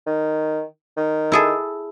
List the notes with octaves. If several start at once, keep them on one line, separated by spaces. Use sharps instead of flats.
D#3
D#3
E4 G#4 A4